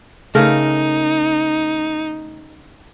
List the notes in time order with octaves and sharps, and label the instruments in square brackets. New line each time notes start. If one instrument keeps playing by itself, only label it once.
[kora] C#3 A3 A#4 [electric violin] D#4